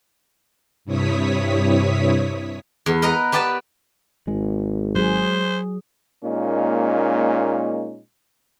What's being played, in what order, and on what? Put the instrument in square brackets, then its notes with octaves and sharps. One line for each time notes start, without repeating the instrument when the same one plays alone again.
[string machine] G2 C3 E4 C#5 D#6 B6
[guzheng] E2
A#4 B4 D#5 F#5 A#5
B3 G4 B4 D5 A5
[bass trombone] G#1 [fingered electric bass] G#3
[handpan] F#3 G#4 [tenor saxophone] C5
[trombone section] A#2 G#3 A#3 C#4 D#4